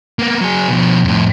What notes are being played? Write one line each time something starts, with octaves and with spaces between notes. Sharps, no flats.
A#3 B3
F#3 G#4
B2 F3
F2 A2